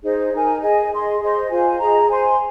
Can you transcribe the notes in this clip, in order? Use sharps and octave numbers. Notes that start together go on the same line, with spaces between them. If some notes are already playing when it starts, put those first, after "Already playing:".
D#4 G#4 C5 D#5
D#4 A#4 G#5
G#4 D#5 G#5
G#4 D#5 C6
G#4 C5 D#5 C6
F4 C5 G#5
G#4 D#5 A#5
C5 G#5 C6